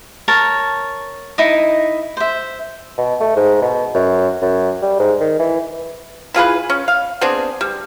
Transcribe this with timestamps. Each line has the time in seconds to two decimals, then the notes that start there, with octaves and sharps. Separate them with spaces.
0.28 A#4 C#5 A5
1.38 D#4 E4 D#5
2.17 C5 E5
2.98 B2
3.20 A3
3.36 G#2
3.62 B2
3.95 F#2
4.42 F#2
4.82 G3
5.00 G#2
5.20 D#3
5.39 E3
6.34 E3 F4 G#4 B4
6.70 C#4
6.88 F5
7.21 B3 C4 D4 G#4
7.61 G3